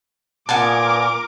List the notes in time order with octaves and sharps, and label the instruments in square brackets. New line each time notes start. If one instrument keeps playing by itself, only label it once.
[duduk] A#2 [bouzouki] B3 G#5 A5 [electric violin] A#4 D6